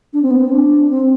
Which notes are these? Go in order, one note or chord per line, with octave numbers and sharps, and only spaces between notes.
D4
C4
B3
C4
D4
C4